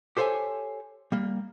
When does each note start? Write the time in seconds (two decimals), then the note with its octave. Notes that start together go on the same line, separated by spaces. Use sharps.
0.17 G4 A4 C5 C#5 E5 G#5
1.12 G3 A#3